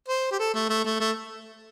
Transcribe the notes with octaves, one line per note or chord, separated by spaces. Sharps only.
C5
G4
A4
A3
A3
A3
A3